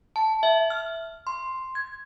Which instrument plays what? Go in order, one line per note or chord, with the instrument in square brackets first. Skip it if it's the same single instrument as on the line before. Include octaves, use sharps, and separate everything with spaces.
[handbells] A5
E5
F6
C6
G#6